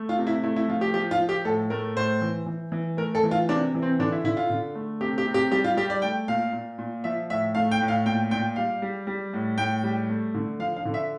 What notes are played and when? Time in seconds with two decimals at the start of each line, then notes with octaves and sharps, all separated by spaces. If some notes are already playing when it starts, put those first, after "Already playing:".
Already playing: A3
0.09 F4
0.18 C3
0.27 E4
0.43 A3 E4
0.56 E4
0.68 F3 F4
0.81 G4
0.94 F3 G4
1.11 F4
1.20 F3
1.29 G4
1.45 A2 A4
1.70 A3 A#4
1.95 A2 C5
2.21 E3
2.46 E3
2.72 E3
2.97 A3 A#4
3.15 A4
3.23 E3
3.31 F4
3.48 C3 D4
3.74 E3
3.82 C4
3.99 D3 D4
4.12 E4
4.24 D3 E4
4.37 F4
4.50 D3
4.75 A3
5.01 C3 G4
5.18 G4
5.27 C3
5.34 G4
5.51 G3 G4
5.64 F4
5.77 G3 G4
5.90 D5
6.02 A3 G5
6.28 A#2 F5
6.53 A#2
6.78 A#2
7.04 F3 E5
7.30 A2 E5
7.54 A3 F5
7.71 G5
7.81 A2
7.88 F5
8.06 A#2 G5
8.31 A#2 G5
8.56 G3 F5
8.82 G3
9.07 G3
9.33 A2
9.58 A2 G5
9.83 G3
10.10 A3
10.34 D3
10.59 F3 F5
10.77 F5
10.85 D3
10.94 E5